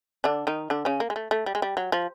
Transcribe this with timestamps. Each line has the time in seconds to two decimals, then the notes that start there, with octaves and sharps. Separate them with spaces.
0.24 D3 D4
0.47 D#3 D#4
0.70 D3 D4
0.85 C#3 C#4
1.00 A#3
1.10 G#3
1.16 A3
1.31 A3
1.46 G3
1.55 G#3
1.62 G3
1.77 F#3
1.92 F3